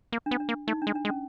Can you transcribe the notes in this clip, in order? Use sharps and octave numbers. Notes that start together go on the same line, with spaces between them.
A#3
D4
B3
D4
A#3
A3 D#4
D4
G#3
D4
G#3
C#4